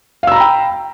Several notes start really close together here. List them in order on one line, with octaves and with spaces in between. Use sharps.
F5 E6 A#5 B5 G5